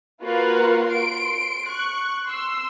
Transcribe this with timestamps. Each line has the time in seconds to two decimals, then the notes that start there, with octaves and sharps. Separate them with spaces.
0.22 A#3 F4 F#4 A#4 B4
0.88 C6 D7
1.68 C#6 F#6
2.27 C6 E6